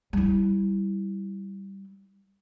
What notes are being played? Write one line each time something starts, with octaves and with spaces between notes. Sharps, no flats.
G3 E4